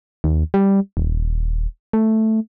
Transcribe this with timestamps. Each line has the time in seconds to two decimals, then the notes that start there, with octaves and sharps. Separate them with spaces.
0.24 D#2
0.54 G3
0.97 D#1
1.93 A3